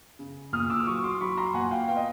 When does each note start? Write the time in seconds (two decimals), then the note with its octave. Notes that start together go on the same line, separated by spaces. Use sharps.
0.19 C#3
0.53 A#2 D#6 F6
0.66 D#6
0.70 D6 E6
0.80 D6
0.87 F#3 C#6 D#6
1.04 C6 D6
1.21 F#3 B5 C#6
1.37 A#5 C6
1.54 A#2 F#5 G#5
1.71 F5 G5
1.88 B3 F5 G5
1.97 D#5